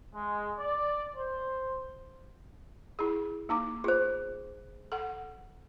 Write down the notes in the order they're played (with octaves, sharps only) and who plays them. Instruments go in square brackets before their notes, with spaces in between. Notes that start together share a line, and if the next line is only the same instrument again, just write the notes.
[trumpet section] G#3
D5
C5
[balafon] E4 G#4
A#3 D#4 D6
[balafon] F4 [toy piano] G#4 C5
[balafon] A4 F#5